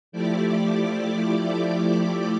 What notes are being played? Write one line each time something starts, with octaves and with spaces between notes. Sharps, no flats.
F3 A3 E4 G4 D5 D6